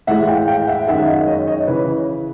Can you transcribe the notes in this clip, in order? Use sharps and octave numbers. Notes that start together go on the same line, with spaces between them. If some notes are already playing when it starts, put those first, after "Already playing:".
A2 E3 G#3 E5 F#5
F5 G5
F5 G5
E5 F#5
F#2 D#3 G#3 E5 F#5
F#5
D#5 F5
C#5 D#5
C#5 D#5
C#3 E3 B4 C#5